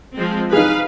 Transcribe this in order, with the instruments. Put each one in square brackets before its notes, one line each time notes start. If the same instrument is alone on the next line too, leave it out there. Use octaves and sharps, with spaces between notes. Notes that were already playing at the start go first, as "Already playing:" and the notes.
[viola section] F3 G#3 C4
[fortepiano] D#4 G#4 [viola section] B4 F5